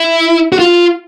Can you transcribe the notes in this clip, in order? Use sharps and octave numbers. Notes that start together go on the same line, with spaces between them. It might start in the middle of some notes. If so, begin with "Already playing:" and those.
Already playing: E4
F#4
F4